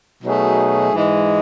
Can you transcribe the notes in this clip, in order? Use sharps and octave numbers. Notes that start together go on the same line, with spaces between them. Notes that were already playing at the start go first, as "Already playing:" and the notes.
B2 F#3 A3 D#4 G#4
G#2 E3 G#3